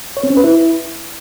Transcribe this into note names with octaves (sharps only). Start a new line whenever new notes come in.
C#5
C4
C#4
B4
E4